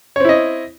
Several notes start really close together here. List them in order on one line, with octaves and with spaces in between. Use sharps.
C#5 C4 E4 D#5